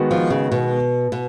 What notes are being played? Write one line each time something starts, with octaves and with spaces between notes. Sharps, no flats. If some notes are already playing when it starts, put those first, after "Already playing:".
Already playing: D#3 G#3 B3 F#4
F3
C#3
B2
B2